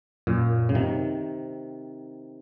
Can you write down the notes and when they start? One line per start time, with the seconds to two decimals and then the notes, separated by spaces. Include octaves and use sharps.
0.27 F#2 A#2
0.69 C#3
0.75 C3 D#3